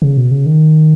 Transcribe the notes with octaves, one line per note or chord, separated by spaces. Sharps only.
C#3
B2
C#3
D#3